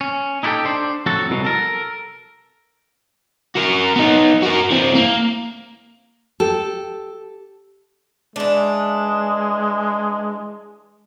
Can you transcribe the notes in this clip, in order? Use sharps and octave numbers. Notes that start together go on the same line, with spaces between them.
C#4
D#4 E4 F#4 G4 A4 G5
D4 C5
F2 A2 F#3 F#4 A4
C2 B2 D#3 F#3
A4 A#4
F#4 A#4
B3 D#4
F#4 A#4
E3 C4
A#3
G4 A4
E3 G#3 D4